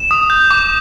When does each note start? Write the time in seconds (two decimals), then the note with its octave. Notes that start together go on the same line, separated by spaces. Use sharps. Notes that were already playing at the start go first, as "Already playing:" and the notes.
Already playing: E7
0.11 D#6
0.30 G6
0.51 D6